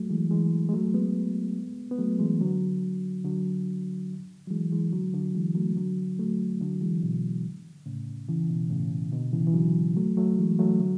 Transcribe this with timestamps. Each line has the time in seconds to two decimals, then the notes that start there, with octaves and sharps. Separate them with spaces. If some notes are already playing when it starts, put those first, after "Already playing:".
Already playing: F#3 A3
0.10 E3 G#3
0.31 E3 G#3
0.69 G#3
0.73 F#3 A3
0.94 G#3 B3
1.91 B3
1.98 F#3 A3
2.19 E3 G#3
2.41 D3 F#3
3.24 D3 F#3
4.47 F#3
4.50 E3 G#3
4.72 E3 G#3
4.92 D3 F#3
5.14 D3 F#3
5.35 E3 G#3
5.55 F#3 A3
5.76 D3 F#3
6.19 F#3 A3
6.61 D3 F#3
6.81 E3 G#3
7.03 B2
7.86 A2 C#3
8.28 C#3 E3
8.50 B2
8.70 A2 C#3
9.12 B2 D3
9.33 C#3 E3
9.47 E3
9.54 D3 F#3
9.96 F#3 A3
10.17 F#3 A3
10.38 E3 G#3
10.59 F#3 A3
10.80 D3 F#3